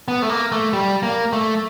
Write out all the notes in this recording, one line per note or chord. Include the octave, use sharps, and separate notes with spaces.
B3
A3
A#3
A3
G3
A#3
A3